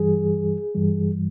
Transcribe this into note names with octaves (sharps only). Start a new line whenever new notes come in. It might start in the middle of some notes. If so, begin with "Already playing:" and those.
Already playing: G2 E3 G3 G#4
G2 E3 G3